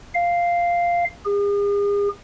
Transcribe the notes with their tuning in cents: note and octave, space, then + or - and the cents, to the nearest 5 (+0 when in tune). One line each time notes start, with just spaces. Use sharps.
F5 -5
G#4 -40